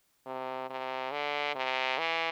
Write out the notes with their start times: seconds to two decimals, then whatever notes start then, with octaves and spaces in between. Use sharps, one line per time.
0.26 C3
0.70 C3
1.12 D3
1.55 C3
1.98 E3